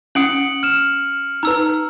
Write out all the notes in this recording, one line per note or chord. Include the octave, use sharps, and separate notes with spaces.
C#4 F#5 D#6 C#7 D7 F#7
F6 E7
D#4 B4 A#5 E6